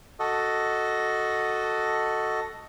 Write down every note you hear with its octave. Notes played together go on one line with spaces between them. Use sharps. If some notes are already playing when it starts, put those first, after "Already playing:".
F#4 A4 D#5